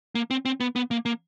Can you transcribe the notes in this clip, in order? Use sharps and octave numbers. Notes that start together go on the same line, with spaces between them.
A#3
C4
C4
B3
B3
A#3
A#3